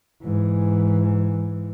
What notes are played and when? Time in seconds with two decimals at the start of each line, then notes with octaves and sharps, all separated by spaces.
0.23 G#2 E3